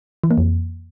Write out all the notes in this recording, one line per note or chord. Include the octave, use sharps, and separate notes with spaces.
E3
A#3
F2